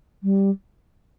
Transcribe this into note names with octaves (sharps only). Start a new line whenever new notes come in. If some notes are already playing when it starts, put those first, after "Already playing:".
G3